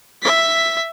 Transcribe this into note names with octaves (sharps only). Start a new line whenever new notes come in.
E5 B6